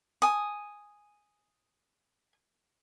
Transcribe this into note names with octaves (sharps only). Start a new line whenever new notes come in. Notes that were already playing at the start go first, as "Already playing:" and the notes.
G#5 D#6